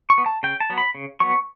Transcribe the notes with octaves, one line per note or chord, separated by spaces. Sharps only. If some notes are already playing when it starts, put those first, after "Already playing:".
C#6
B3
A5
C#3 G5
A5
F#3 B3
B5
C#3
F#3 B3 C#6